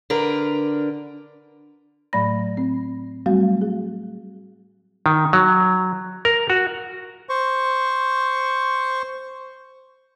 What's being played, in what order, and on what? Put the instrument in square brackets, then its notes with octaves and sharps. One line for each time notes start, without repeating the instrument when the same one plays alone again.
[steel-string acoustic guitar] D3 D4 A#4 B4
[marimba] A2 F#3 A3 D5 B5 A#6
C4
F#3 G3 A3 C4 F#4 F5
G#4
[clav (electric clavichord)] D#3
F#3
A#4
F#4
[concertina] C5 C#6